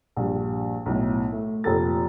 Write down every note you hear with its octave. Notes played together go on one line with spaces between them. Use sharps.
A#1 G2 G3
B1 A2
A3
F1 A#2 F3 G4 A4 A6